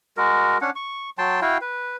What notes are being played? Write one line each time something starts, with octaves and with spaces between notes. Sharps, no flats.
G#3 F#4 A#4
C#4 D4 F#5
C#6
F#3 G5 A5 C6
E4 F#4 F5 G5
B4